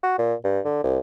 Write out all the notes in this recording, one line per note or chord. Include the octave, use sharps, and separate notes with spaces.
F#4
A#2
G2
D3
C2